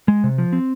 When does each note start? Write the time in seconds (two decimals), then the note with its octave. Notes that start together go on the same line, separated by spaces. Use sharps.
0.08 G#3
0.24 C3
0.38 F3
0.53 C4